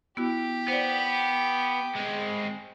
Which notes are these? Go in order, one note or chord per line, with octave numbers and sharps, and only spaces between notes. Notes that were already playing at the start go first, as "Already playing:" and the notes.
B3 E4 F#4 G4
B3 C5 D5
G#3 C4